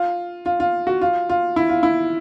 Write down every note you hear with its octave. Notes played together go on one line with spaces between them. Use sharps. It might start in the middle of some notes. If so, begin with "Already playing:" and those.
Already playing: F4
F4
F4
F#4
F4
F4
E4
F4
E4